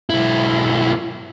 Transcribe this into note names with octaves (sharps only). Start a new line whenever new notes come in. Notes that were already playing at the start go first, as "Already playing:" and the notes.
B1 E4